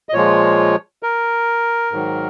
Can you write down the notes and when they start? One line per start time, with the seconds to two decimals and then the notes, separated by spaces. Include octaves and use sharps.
0.09 D#5
0.13 A#2 F3 G#3 C#5
1.03 A#4
1.92 G#2 D#3 F#3